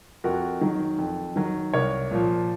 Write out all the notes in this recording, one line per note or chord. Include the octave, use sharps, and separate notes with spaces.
F2 F#4 A#4
D#3 F#3
F2
D#3 F#3
C2 A#4 C#5
A#2 F3